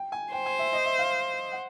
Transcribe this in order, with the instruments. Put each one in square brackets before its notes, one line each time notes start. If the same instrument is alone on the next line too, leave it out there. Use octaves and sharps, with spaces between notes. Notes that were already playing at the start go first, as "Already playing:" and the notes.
Already playing: [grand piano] G5
G#5
[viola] C5 [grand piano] G5
[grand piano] G#5
E5
D#5
E5
F5
F#5